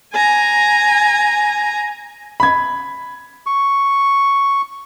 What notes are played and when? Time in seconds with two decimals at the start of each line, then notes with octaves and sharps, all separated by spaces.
0.13 G#5 A#5
2.40 B5 G#6
3.46 C#6